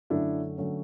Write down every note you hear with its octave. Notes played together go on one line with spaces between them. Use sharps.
F#2 D3 F#3 A3 C#4 D4 E4
D3 F#3 A3 C#4